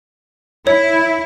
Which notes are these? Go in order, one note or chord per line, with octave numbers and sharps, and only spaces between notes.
E4 C#5